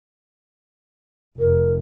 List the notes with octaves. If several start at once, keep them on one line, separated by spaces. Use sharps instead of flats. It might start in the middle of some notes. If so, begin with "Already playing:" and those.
F1 A#4